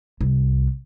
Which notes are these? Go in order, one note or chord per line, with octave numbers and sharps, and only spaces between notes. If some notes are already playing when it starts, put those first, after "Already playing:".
C2 F2